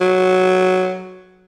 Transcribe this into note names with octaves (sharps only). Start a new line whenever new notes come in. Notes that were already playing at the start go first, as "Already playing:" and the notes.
F#3